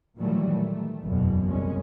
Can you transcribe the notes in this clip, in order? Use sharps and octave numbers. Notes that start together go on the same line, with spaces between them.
A#2 D#3 E3 F#3 G3 A3
A3
F#1 E2 B2
C2 G#3 C#4